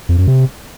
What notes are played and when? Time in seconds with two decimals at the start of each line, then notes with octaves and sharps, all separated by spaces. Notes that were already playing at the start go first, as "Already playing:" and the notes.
0.09 F2
0.18 F#2
0.27 C3